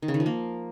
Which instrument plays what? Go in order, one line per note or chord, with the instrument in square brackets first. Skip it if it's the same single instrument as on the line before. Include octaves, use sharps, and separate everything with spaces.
[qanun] D#3
C#3
D#3
F3
A#3